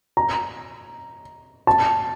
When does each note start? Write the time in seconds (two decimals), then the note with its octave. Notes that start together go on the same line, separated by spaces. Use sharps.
0.17 A#5
1.67 A5